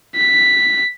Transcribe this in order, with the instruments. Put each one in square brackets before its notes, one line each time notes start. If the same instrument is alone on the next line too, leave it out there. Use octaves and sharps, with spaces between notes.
[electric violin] B6